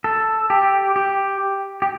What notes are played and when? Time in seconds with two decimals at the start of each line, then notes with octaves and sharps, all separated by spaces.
0.04 A4
0.50 G4
0.96 G4
1.82 G4